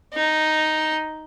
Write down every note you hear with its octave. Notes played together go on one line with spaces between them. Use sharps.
D#4